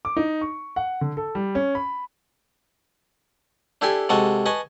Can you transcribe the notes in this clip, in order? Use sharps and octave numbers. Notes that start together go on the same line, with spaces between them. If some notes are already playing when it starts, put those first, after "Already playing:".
D6
D#4
C#6
F#5
D3
A4
G3
C#4
B5
D4 E4 G4 A4 G#5 C6
C3 G#3 F#4 A4 D#5 A5
B4 D#5 G#5 A5 C#6